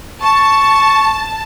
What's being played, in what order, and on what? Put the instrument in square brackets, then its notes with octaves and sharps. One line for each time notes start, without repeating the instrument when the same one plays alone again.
[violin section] A5 [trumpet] C#6